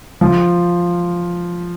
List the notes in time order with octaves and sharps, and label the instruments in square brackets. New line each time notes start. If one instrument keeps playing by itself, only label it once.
[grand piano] F3